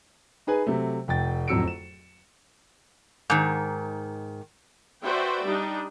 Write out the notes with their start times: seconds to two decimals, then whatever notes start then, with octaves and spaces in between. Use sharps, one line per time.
0.47 D#4 G#4 B4 G#5
0.67 C3 F#3 A3
1.08 F1 G5 A6
1.48 D1 F2 F#3 E6 C#7 D7
1.68 E7
3.30 G#2 D#3
5.05 F#4 B4 C5 D5 E5 G5
5.45 G3 D4 D#4